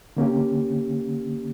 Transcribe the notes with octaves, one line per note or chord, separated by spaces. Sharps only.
D3 A#3 C#4 G4